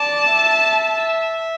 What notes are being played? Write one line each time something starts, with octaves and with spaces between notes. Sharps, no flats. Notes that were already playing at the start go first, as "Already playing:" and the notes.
Already playing: D5 A5
E5